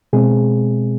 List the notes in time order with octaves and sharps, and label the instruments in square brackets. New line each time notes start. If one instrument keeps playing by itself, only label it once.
[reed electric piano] B2 G#3 C4 G#4